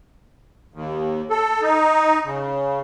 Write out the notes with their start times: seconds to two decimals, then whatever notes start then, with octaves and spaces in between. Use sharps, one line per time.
0.74 D#2
1.30 A4
1.62 D#4
2.25 C#3